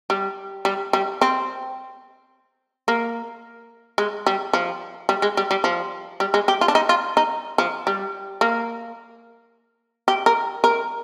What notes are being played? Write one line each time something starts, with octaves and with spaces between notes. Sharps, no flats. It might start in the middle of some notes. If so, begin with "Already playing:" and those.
G3
G3
G3
C4
A#3
G#3
G3
F3
G3
G#3
G3
G3
F3
G3
G#3
G4
F4
D4
D#4
F4
D#4
F3
G3
A#3
G4
A#4
A#4